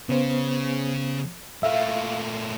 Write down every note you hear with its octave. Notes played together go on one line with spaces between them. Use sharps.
C#3 B3 C5
A#2 A3 E5 F5